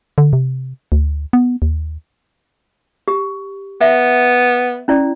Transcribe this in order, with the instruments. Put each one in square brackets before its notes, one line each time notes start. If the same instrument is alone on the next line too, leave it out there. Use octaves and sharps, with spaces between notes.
[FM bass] D3
C3
D2
B3
D#2
[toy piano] G4
[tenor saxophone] B3 [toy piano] E5
[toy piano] C#4 E4 D5